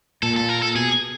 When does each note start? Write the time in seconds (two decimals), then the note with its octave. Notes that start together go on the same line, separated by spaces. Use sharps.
0.23 A#2 A4
0.36 A4
0.49 A#4
0.62 A4
0.75 B2 G#4